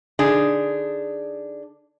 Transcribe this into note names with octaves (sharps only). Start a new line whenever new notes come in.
D3 D4 D#4 G#4